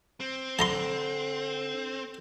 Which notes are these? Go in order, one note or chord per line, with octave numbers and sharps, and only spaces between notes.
C4
D3 A5 A#5 C6